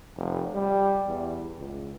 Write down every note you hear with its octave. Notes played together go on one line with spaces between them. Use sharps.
F1
G3
E2
C#2